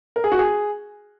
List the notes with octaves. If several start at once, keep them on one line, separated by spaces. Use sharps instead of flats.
A#4
G#4
F#4
G#4